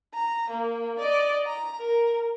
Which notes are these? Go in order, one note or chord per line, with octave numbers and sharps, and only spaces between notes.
A#5
A#3
D5 D#5
A#5
A#4